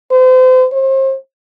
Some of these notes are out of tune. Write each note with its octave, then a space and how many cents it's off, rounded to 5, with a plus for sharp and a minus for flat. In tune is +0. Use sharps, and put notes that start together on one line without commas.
C5 -35
C5 +35